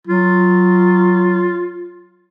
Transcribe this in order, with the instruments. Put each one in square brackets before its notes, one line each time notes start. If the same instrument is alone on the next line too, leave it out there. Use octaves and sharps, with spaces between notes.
[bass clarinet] F#3 [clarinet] F4